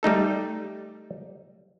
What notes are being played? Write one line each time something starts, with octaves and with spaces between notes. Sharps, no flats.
G3 A3 D#4 A4